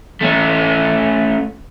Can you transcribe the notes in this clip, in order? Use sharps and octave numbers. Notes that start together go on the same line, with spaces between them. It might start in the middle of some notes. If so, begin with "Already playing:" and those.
A3 C#4